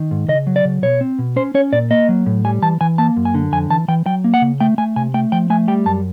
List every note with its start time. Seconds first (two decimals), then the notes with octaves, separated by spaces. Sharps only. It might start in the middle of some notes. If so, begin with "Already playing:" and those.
Already playing: D#3
0.11 G#2
0.28 C#3 D#5
0.47 F#3
0.56 D5
0.65 C#3
0.82 B2 C#5
1.01 C4
1.19 B2
1.36 C#4 C5
1.54 C#4 C#5
1.72 A#2 D5
1.90 A#3 D#5
2.09 F#3
2.26 A2
2.45 G3 G#5
2.62 E3 A5
2.81 E3 G#5
2.98 A#3 A5
3.17 F#2
3.25 G#5
3.34 D3
3.52 F2 G#5
3.70 E3 A5
3.88 E3 G5
4.06 F#3 G5
4.24 A#3
4.34 F#5
4.42 C#3
4.60 A3 G5
4.78 A3 G#5
4.96 C3 G#5
5.14 A3 G5
5.32 F3 G5
5.50 A3 G#5
5.68 G3 G5
5.86 F#2 A5